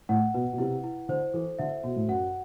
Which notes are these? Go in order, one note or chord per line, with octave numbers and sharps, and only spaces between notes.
A2 F#5
B2 B4
B2
C3 E4
E4
D3 C5
E3 A4
D3 E5
B2 F#4
A2
F#2 F#5